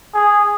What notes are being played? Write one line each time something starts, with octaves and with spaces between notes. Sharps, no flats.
G#4